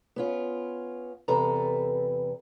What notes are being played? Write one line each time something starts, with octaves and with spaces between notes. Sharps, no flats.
B3 C#4 F4
E2 C3 A4 B4 A#5